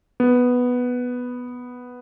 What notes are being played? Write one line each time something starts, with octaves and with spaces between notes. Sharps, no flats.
B3